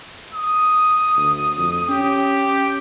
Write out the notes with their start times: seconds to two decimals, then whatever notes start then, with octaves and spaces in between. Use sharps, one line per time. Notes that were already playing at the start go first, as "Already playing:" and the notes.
0.34 D#6
1.17 D2
1.57 F2
1.89 C#4 G4